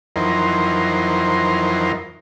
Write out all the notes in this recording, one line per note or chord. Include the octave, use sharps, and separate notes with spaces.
F2 E3 F#3 D#4 A#4 C5